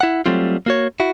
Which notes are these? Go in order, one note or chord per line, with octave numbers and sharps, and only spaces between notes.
E4 F#5
F#3 G3 A3 C4 F4
A#3 F#4 C#5
E4 F#4